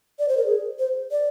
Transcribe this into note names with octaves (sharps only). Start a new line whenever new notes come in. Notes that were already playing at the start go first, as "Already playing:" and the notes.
D5
C5
A#4
G#4
C5
D5